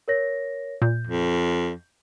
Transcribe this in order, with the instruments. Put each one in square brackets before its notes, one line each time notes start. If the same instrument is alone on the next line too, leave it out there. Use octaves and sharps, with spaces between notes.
[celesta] A#4 C#5 A#6
[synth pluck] A#2 [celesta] G6
[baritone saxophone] F2